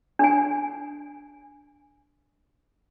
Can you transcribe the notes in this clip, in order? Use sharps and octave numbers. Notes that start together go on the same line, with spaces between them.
D4 G#5